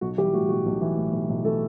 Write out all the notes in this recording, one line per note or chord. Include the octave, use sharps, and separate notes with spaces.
B1 F#4
E3 G3 G4
A2 F#4
B1 F#4
B1
E3
A2
B1
B1
E3 A3 A4